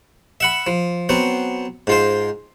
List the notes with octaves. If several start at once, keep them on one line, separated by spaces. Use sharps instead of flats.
E5 F#5 B5
F3
F#3 B3 C4
G#2 F4 C5